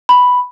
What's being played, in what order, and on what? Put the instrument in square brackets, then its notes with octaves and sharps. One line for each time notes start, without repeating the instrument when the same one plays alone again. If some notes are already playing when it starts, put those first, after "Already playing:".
[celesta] B5